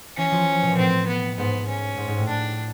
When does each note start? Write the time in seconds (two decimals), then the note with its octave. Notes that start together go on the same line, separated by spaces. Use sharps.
0.17 E3 C#4
0.31 F3
0.62 B2
0.71 A#2
0.77 A2 C4
1.07 B3
1.37 G#2 B3
1.68 C#4
1.97 G#2
2.08 G#2
2.17 A2
2.28 D4